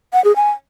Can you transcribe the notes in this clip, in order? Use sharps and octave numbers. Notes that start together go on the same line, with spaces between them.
F#5
G#4
G#5